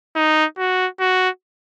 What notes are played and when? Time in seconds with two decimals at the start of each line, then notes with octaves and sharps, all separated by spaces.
0.16 D#4
0.58 F#4
1.00 F#4